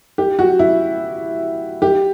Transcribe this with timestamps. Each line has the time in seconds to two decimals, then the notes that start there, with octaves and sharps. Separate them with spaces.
0.18 G4
0.39 F#4
0.59 E4
1.82 G4